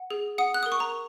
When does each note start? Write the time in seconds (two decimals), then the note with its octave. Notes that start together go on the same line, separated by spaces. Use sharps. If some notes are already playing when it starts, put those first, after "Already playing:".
Already playing: F#5
0.11 G#4
0.38 F#5 D#6
0.54 F#6
0.63 A#4 D#6
0.72 C#6
0.80 A#5